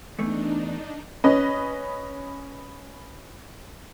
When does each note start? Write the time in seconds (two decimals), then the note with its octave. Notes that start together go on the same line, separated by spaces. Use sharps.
0.19 E2 A3 D4 D#4
1.24 C#4 B4 D#5